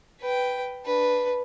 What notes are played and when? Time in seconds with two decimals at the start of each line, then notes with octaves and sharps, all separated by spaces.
0.20 B4 G5
0.85 D4 B4